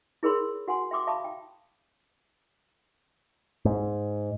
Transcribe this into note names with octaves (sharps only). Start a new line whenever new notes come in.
E4 G#4 A#4 C#5 B5 C6
F#4 F#5 G#5 C6
E5 G5 C6 D6 D#6
E5 F5 A5 B5 C#6 D#6
G5
G#2